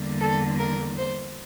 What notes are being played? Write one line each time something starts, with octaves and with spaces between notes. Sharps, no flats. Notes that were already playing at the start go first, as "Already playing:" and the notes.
Already playing: E2 D3 G3 A#3
A4
A#4
C5